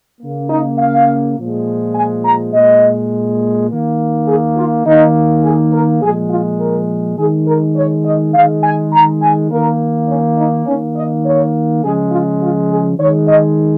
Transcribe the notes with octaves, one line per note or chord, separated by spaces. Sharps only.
C#3 A#3
D#4
F5
A#2 F3 G#3
G#5
A#5
A#2 G#3 D#5
D#3 A#3
G#4
F4
D#3 A#3 D#4
G#4
A#4
A#2 F3 G#3 G#4
F4
A#4
D#3 G#3 G#4
A#4
C#5
D#5
D#3 G#3 F5
G#5
A#5
G#5
D#3 A#3 A#4
C#4
D#4
D#3 A#3 C#4
D#5
C#5
C#3 F3 G#3 G#4
F4
F4
G#4
D#3 G#3 C#5
D#5